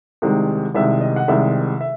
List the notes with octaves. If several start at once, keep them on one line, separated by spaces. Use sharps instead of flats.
C2 C3 D#3 G#3
C2 C3 D#3 G#3 E5
D#5
F#5
C2 C3 D#3 G#3 E5
E5